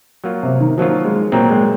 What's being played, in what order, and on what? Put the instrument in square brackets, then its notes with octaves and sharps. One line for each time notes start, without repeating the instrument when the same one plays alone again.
[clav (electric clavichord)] F#3 A#3 F4
[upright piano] C3
D#3
[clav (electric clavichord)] D#3 F#3 A#3 F4 [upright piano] F3
[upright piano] G#3
[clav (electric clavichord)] A#2 F#3 C4 [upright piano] A#3
[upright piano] G#3